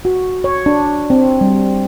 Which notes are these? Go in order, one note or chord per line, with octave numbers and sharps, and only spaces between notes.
F#4
C#5
D4
C4
G3